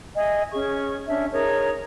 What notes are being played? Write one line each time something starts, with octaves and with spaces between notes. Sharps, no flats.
D#5 E5 G#5
C#4 G#4 C#6
C#4 D4 E5
D#4 G#4 A#4 C#5